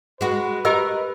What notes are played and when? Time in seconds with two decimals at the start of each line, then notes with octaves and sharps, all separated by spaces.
0.21 G#3 F#4 B4
0.65 G4 A#4 D#5 E6